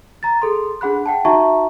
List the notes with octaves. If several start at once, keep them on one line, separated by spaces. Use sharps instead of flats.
A#5 A6
G#4 A4 C6
D4 G#4 F#5 B5 F#6
F#5 G5 A5
D#4 F#4 E5 A5 A#5 C#6